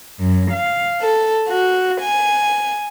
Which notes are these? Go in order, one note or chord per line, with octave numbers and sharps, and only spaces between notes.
F#2
F5
A4
F#4
G#5